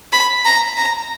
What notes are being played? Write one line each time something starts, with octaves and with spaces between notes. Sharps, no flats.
B5
A#5
A#5